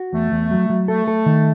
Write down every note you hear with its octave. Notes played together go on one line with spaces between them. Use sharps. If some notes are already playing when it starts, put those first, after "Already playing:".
Already playing: F#4
E2 A3
E2
F#3
F#3
A3 A4
A4
D#3